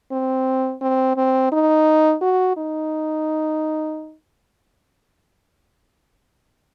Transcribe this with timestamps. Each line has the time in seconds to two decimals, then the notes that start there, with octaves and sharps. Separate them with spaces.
0.12 C4
0.81 C4
1.17 C4
1.52 D#4
2.22 F#4
2.57 D#4